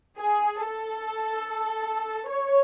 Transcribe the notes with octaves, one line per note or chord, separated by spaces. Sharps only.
G#4
A4
C#5